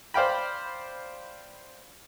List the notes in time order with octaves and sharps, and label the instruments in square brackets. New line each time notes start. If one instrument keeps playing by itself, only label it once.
[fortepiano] C5 D5 F5 G5 B5